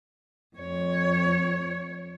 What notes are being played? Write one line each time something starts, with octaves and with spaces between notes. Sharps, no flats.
F2 C#5